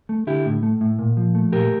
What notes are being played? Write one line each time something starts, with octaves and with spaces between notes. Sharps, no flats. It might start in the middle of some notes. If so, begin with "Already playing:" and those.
A3
D3 E4 G4
A2
A3
A2
A#2
F3
A3
A#2 G4 A#4